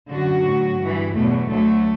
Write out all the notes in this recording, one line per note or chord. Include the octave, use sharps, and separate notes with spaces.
F#2 D3 F#3 F#4
A2 F#3
G2 E3
E2 B2 F#3 A3
D2 D3 F#3 A3